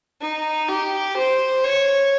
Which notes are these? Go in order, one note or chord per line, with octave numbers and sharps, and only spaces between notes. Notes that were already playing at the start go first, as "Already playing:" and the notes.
D#4
G4
C5
C#5